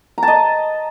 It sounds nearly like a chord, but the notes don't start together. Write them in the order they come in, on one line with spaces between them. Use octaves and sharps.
A#5 A5 D#5